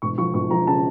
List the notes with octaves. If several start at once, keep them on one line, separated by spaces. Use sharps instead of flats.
E1 C#6
F3 C#6
E1 C#6
F3 A#5
C#3 A5